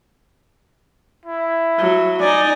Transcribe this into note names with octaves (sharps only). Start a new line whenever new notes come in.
E4
F#3
D#4 D5 G#5